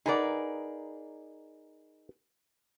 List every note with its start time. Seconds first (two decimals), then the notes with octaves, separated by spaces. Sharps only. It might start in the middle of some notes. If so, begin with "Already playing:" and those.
0.06 D#4 G#4 A#4 B4 D5 F#5